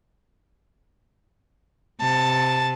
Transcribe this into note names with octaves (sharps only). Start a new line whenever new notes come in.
C3 A5